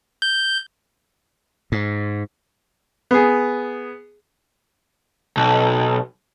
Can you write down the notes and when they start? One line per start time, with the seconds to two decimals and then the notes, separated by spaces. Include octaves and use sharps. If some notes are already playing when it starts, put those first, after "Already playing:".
0.22 G6
1.72 G#2
3.11 B3 G#4
5.37 B1